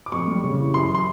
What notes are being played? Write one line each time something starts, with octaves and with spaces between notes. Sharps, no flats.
D6
F2 C#6
G3
C#3
E3
F#2 C6
C6